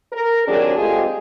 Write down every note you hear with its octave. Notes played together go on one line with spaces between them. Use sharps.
A#4
D#2 F#3 C4 D4 G#4
G#3 A3 C4 F4 G4 G#4